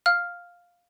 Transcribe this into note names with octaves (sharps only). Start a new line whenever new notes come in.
F5 F6